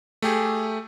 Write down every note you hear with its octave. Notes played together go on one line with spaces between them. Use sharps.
A3 G4 G#4